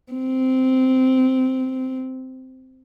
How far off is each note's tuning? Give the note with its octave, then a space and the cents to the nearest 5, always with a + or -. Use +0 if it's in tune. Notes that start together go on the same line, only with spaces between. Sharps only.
C4 -10